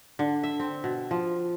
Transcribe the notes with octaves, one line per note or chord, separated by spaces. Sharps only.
D3
E5
C4
B2
F3